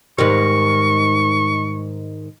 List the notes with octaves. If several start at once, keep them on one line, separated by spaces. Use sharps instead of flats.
G#2 D#3 G3 C#6